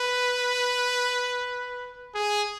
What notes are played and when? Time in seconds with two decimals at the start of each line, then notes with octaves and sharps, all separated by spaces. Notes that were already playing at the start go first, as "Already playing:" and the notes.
Already playing: B4
2.15 G#4